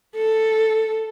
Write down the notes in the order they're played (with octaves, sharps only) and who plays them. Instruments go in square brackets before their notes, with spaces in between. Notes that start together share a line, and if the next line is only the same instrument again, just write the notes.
[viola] A4